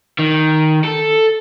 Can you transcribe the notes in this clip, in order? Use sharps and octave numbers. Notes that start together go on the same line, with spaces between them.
D#3
A4